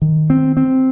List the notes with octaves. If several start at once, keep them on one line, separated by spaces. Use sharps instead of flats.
D#3
C4
C4